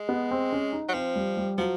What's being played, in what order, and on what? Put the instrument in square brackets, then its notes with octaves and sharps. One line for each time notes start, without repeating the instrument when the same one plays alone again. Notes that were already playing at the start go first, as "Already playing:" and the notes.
Already playing: [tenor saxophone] G#3
[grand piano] B3
C4
C#4
D#4
[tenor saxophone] F#3
[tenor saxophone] F3 [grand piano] C4
[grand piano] G3
G3
[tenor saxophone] F3 [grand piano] F#3